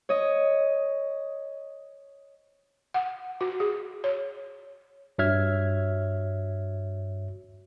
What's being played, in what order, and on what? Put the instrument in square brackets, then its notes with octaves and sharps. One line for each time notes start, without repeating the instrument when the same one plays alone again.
[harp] C#5 D#5
[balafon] F#5
F#4
G#4
C#5
[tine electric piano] G2 F#4 C#5 E5 F6 G#6